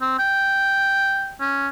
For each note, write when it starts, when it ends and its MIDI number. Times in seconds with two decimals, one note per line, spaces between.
0.01 0.15 60
0.19 1.33 79
1.41 1.68 61